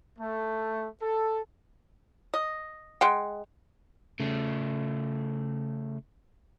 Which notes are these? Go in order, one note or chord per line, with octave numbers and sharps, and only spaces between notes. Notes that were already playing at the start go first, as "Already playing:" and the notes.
A3
A4
D#5
G#3 F#5 G5
C#3 A3